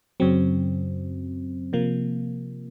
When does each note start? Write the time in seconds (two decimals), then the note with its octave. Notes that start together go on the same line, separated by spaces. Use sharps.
0.20 F#2 C#3 F#3 C4
1.73 C3 F3 A#3